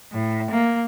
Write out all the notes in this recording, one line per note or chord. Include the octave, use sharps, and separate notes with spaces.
A2
A#3